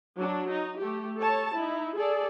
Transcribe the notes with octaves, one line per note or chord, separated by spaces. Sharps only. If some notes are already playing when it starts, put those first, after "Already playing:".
F#3 D4
D#4
A3 G4
A4 C#5 A5
D#4 E4
G#4 A4 D5